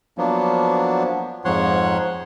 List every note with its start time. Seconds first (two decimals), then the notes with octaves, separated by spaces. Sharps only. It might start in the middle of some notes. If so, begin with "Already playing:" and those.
0.18 F3 F#3 A#3 B3 D4
1.45 F2 G#2 F3 C#5 F#5 C6